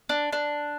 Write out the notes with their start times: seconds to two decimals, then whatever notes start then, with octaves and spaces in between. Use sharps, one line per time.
0.09 D4
0.32 D4